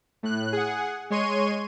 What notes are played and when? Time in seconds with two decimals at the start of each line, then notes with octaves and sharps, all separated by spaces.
0.23 A2 F#6
0.53 G#4 F#5
1.10 G#3 C#5 C6 C#6 D#7